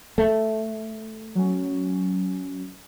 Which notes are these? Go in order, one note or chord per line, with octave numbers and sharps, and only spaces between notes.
A3
F#3 C#4